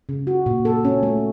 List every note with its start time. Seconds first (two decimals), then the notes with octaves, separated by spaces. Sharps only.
0.09 C#3
0.27 F#4
0.46 A#2
0.65 A4
0.85 C#4
1.03 A3